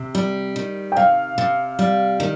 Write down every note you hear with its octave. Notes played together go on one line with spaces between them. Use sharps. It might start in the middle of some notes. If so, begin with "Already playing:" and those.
Already playing: C3
G3
D#3
G5
C3 F5
C3
G3
D#3